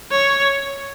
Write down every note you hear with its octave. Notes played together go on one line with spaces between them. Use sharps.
C#5